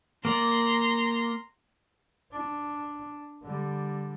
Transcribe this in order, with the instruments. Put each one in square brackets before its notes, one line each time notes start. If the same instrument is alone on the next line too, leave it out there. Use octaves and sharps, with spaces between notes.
[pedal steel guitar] A#3 D5 [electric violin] A#5 C6
[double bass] D4
D3 G3